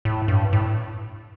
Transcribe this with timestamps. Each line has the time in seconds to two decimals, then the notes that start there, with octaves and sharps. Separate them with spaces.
0.05 A2
0.28 G2
0.53 A2